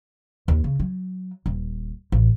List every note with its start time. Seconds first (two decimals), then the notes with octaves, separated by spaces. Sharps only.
0.48 D#2
0.64 C#3
0.80 F#3
1.46 D#1
2.12 A1